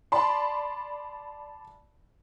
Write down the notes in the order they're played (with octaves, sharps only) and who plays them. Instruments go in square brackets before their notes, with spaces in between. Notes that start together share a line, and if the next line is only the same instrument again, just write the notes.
[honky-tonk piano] D5 A5 B5 C6